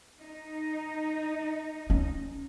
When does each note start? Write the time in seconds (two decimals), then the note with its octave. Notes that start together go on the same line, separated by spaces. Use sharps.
0.20 D#4
1.90 C#4